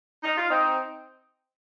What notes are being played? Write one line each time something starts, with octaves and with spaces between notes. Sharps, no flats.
D#4
F4
C4 D#4